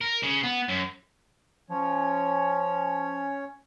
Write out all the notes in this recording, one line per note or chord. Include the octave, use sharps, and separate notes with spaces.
A#4
C#3
B3
F#2
F3 C#4 C#5